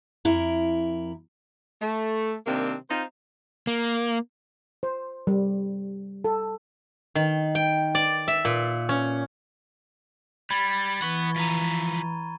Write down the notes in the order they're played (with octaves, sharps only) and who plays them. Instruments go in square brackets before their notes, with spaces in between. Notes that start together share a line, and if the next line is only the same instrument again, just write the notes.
[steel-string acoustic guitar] F2 E4 A#4
[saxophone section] A3
C3 D#3 G3 A#3 C4 D4
C4 D#4 F4 C5
[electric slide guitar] A#3
[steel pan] C5
G3
A4
[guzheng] D#3
G5
D5
E5
A#2
C#4
[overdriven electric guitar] G3 [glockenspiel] B5 G#6 A6
[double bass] E3 [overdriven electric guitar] B4 F#5 [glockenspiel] C#6 G7
[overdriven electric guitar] F3 B4 [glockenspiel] A#5 D#7